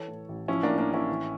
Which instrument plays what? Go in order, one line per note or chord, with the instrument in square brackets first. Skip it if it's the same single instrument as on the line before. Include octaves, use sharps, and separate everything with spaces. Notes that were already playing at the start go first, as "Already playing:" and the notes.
Already playing: [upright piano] E3 A4 C#5
A2
A1
F3 C#4 E4
A#3 D4
A2
A#3 D4
A1 C#4 E4
E3